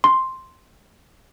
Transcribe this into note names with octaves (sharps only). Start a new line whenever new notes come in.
C6